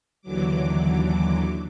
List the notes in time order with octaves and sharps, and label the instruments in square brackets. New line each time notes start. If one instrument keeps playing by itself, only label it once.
[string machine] D#2 D3 E3 F#3 D6